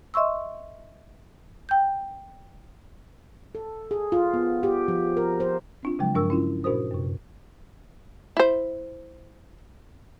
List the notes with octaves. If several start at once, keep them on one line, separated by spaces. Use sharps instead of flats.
D#5 E5 C6 C#6 E6
G5 G6
A4
G#4
F4
B3
G4
F3
A#4
C5
C4 D4 F4
C#3 F3 F#3 G#3 G5
G2 F3 D4 A#4 C#6 E6
C#4 E4 F4
A#2 D4 F#4 A#4 C5 D#6
F#2 C3
E4 C5